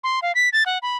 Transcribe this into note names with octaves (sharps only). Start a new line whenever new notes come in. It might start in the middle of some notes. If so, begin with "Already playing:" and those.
C6
F5
B6
A6
F#5
B5